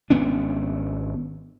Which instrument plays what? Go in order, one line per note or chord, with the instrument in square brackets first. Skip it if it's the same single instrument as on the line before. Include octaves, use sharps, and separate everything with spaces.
[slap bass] G#1 B3 C#4 D4